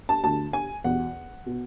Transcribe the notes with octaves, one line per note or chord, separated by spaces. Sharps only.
A5
D2 D3 A5
G#5
E2 B2 F#5
B2